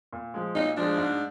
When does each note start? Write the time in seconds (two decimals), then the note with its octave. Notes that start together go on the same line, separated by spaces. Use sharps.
0.13 A#2
0.34 F3 G#3
0.55 A#2 D#4
0.77 F3 G#3 D4
0.98 G#2